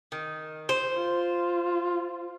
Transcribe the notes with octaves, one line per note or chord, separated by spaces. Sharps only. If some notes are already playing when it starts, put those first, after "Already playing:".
D#3
C5
F4